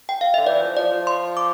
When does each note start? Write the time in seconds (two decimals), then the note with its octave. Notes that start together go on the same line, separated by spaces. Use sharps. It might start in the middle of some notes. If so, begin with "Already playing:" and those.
0.09 G5
0.21 F5
0.34 D3 E5
0.46 E3 D5
0.62 F3
0.77 F3 D5
0.91 F3
1.07 C6
1.37 D6